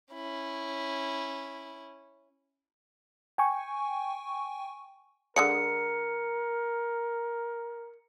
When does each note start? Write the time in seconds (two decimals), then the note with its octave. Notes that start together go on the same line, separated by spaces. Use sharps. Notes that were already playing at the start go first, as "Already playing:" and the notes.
0.14 C#4 E4
3.38 G5 G#5 C#6
5.36 D3 G#3 A#4 D5 C#7